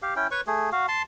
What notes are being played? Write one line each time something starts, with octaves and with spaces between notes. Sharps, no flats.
G4 F5
C#4 E4 G5
B4 C#5 C#6
A3 G#4
F#4 F5
A5 C6